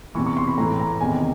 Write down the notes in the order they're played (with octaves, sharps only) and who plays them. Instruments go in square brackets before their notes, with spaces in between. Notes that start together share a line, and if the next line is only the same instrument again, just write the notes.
[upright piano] E2 C3 E3 C#6
C#6
C6
B5
A2 E3 A#5
A#5
E2 C3 D#3 G#5